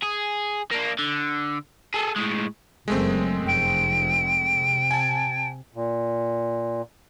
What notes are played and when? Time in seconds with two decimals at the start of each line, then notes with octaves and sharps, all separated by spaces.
0.02 G#4
0.71 A#3 D4
0.99 D3
1.94 G#4 A4
2.16 A2 G#3
2.88 F#1 F#2 G#3 A3 C4
3.47 F1 G5
4.56 C3
4.91 G#5 A5
5.75 A#2